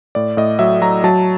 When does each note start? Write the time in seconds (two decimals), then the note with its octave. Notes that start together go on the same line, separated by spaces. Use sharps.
0.15 A2 D5
0.37 A2 D#5
0.59 F#3 E5
0.82 F#3 A#5
1.04 F#3 A5